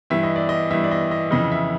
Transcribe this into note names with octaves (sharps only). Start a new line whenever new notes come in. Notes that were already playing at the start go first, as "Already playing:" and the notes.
G2 E3 E5
D#5
D5
D#5
G2 E3 E5
D5
D#5
D#5
F2 C#3 E3 D#5
E5